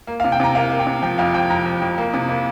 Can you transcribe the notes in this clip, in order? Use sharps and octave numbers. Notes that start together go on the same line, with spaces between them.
A#3
C3 F5
G5
C3 A#5
A#3 F5
A#3
G5
C3
F3 G5
F2 F5
F2 G5
F2 A#5
F2
F2
A#3
C3
A#3